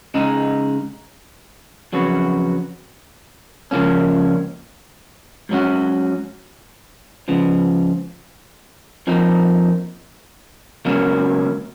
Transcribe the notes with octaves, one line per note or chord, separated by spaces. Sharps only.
C#3 G#3 D#4
F2 C#3 F#3 B3 F#4
C#2 C#3 F3 A#3 C#4
G#2 F#3 C#4 F#4
C#2 C#3 F3 B3
F2 F3 A#3 D#4
C#2 B2 F#3 A#3 C#4